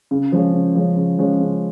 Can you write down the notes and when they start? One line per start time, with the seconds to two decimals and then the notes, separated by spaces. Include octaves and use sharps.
0.11 C#3
0.32 F3 G#3 C#4
0.53 C#3
0.75 F3 G#3 C#4
0.96 C#3
1.18 F3 G#3 C#4
1.40 C#3